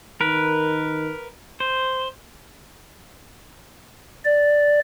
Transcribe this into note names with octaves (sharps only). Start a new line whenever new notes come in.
D#3 A#4 B4
C5
D5